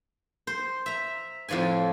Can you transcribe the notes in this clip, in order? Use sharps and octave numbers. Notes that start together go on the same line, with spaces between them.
C5
E5 A#5
F2 A2 F3 D5 G#5